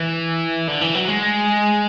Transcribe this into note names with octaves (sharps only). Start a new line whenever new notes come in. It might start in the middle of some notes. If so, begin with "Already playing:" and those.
Already playing: E3
D3
E3
F#3
G#3